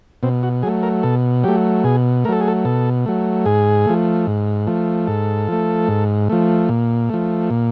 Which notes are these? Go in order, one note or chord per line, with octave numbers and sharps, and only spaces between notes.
B2 C4
F#4
F#3 A3 G#4
A#4
B2 A4
F#3 A3 G4
B2 G#4
F#3 A3 A4 A#4
G#4
A4
B2 A4
F#3 A3
G#2 G#4
F3 A3
G#2
F3 A3
G#2 A4
F3 A3
G#2
F3 A3
A#2
F3 A3
A#2